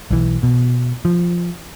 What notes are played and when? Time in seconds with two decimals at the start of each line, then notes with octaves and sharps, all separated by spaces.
0.11 B1 E3
0.43 B2
1.05 F3